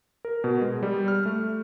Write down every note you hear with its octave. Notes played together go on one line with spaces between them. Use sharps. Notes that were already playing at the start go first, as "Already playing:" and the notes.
A#4
B2
G#3
G3
F6
A3